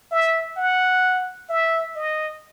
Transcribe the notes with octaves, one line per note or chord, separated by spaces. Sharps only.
E5
F#5
E5
D#5